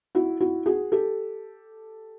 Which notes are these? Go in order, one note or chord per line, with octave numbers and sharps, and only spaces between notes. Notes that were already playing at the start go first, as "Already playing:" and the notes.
E4 F#4
E4 F#4
F#4 G#4
G4 A4